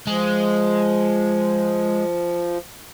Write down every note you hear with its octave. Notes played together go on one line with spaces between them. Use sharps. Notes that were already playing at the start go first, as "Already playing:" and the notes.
F3 G#3